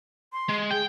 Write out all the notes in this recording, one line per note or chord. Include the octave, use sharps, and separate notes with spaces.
C6
G#3
G#4 G5